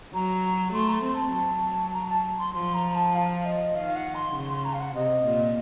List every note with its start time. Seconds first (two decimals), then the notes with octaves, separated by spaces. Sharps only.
0.13 F#3 A#5
0.73 A3 C6
0.87 A#5
0.93 C6
1.03 C4
1.14 A5
1.33 F#3
1.93 A#5
2.09 A5
2.39 C6
2.53 F3 C6
2.74 A#5
2.94 A5
3.14 F5
3.45 D#5
3.75 D#3 F5
3.95 F#5
4.14 C6
4.35 C#3
4.49 C6
4.64 A#5
4.73 F5
4.79 F#5
4.94 C3 D#5
5.25 A#2